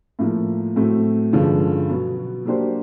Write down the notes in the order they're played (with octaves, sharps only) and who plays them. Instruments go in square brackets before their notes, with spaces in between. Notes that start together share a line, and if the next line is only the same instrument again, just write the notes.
[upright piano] A2 F3 A#3
A2 F#3 A3 C4
G2 D3 F3 G#3 C#4
B2 F#3 B3
F#3 A#3 D4 G4 C5